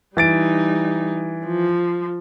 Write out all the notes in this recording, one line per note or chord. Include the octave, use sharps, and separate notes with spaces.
E3 G3 D#4 A6 D7
F3